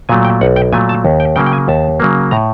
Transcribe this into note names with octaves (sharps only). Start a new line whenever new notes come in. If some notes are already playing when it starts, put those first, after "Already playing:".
A#2 F#3 A3 G#5
G5
B1 F#5
G5
A#2 F#3 A3 G#5
A5
D#2
G5
C#3 F#3 A#3 G5
G5
G#5
D#2 A5
C#3 F#3 A#3
A2 A#5